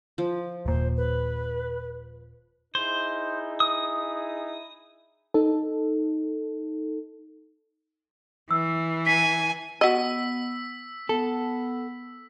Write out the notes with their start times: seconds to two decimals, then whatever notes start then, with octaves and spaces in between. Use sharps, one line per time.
0.18 F3
0.66 D#1 A#2 C5
0.96 B4
2.75 D#4 E4 G#4 C5
3.60 D#6
5.34 D#4 A4
8.51 E3 E6
9.06 G#5 B6
9.81 B3 F#4 D#5 E6 B6
11.09 B3 A4